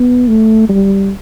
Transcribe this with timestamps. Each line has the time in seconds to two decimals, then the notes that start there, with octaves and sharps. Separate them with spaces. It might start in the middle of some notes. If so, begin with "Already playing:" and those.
Already playing: B3
0.28 A3
0.69 G3